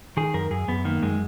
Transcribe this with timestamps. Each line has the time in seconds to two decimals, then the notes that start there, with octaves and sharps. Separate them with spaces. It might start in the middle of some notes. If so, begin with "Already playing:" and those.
0.17 D#3 G#4
0.34 F#2 A#4
0.51 F#2 G#4
0.68 F#2 B3
0.85 D#3 A#3
1.02 F#2 G#3